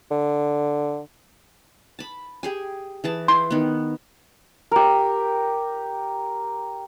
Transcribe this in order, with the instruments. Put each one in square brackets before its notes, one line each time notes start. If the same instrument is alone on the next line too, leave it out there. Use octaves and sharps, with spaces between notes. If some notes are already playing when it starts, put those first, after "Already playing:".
[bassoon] D3
[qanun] A5 B5
G4 G#4 G#5
E3 G#4 A5
[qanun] E4 [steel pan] C6
[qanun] D#3 B3
[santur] G4 A#4